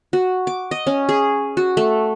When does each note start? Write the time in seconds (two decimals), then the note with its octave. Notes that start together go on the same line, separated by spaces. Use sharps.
0.13 F#4
0.47 D6
0.71 D#5
0.87 C#4
1.09 G#4
1.57 F#4
1.77 A3